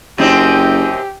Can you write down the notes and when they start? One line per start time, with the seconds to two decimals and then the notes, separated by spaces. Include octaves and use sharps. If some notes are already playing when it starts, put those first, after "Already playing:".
0.18 F#1 F#2 C4 D#4 G4